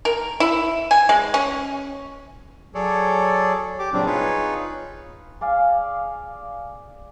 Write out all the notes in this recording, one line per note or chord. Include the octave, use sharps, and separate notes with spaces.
A#4
E4
G#5
G#3
C#4
F#3 G#4 A4 C#5 D5
G4 D6
A#2 C#3 F#3 G3 C4 D4
D#4 F4 G#4 B4 C#5
G#4 D5 F5 G#5